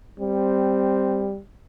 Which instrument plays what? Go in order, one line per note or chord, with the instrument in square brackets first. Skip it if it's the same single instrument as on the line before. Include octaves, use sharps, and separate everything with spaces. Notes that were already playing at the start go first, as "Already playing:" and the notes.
[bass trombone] G3 [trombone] C4